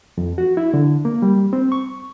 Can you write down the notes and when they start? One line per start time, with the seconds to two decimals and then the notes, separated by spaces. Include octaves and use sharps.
0.18 F2
0.38 F#4
0.57 E4
0.74 D3
1.05 A#3
1.22 G3
1.53 C4
1.72 C#6